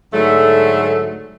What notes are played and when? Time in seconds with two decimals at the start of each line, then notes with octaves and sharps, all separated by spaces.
0.13 G#2 D3 F#3 A3